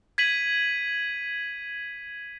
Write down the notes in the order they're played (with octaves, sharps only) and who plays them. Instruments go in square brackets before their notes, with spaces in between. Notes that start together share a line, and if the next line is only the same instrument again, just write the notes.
[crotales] G#6 B6 D#7 F#7